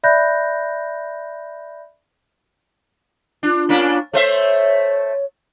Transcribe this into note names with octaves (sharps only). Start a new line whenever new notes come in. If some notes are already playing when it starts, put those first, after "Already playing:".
D5 E5 B5 F#6 G6 A#6
D4 F4
A#3 C#4 D4
A3 C5 C#5 E5